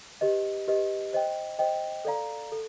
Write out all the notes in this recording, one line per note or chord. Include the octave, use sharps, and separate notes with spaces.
G4 B4 D#5
G4 B4 D#5
C5 D#5 G5
C5 D#5 G5
A4 D5 F5 A#5
A4